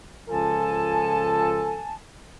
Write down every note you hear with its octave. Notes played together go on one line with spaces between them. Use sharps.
C#2 F3 A4 G#5 A5